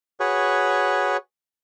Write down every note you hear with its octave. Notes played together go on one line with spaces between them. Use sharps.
F#4 G#4 B4 C#5